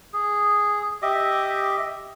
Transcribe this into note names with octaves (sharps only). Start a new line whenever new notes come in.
G#4
G4 D#5 E5 D6